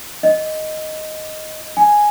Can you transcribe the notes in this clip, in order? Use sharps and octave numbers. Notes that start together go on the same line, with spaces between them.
D#5
G#5